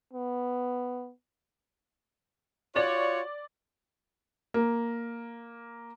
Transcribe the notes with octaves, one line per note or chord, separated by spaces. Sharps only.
B3
F4 F#4 C#5 D5
A#3